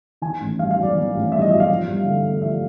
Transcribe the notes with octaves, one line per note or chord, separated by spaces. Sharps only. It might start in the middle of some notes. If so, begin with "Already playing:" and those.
D#3 G#5
A1
G2 F5
F5
F#3 D5
D#3
A1
G2 E5
D#5
F#3 E5
F5
F3
G2
D3
A3
F3 E5